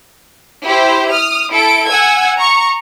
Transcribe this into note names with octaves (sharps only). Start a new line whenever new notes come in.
E4 G4 C5
D#6 F6
E4 A4 D7
F#5 G#5 E6 G#6
A#5 C#6